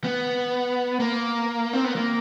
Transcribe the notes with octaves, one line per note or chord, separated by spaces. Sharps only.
B3
A#3
C4
B3
A#3